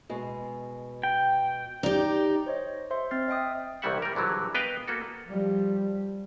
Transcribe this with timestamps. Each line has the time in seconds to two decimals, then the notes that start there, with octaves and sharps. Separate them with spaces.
0.09 B2 G#3
1.03 G5
1.83 D#4 G4 D5
2.46 C5 C#5 D#5
2.91 C5 E5 C6
3.11 C4 F6 A6 C7
3.28 D#5 E5 G5 D#6
3.82 C2 D#3 E3 G3 E5 F#5
4.02 G3 A#4
4.15 A#1 D3 E3 F#3 G3
4.55 B3 B4 D#5 F5 G5
4.88 A#3 B3 F#4 A4
5.27 F3 G3